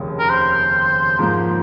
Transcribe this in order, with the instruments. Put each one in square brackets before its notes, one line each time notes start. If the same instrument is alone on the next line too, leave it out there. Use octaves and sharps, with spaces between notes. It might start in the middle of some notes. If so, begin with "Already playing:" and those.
Already playing: [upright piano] F1 D#2 C#3
[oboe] A#4
C5
[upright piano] G#2 F3 A#3